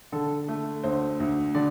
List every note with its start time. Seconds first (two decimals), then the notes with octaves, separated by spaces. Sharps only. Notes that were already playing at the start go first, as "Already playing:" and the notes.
0.12 D3 A4
0.48 A3
0.84 D2 C5
1.20 D2
1.54 D3 D5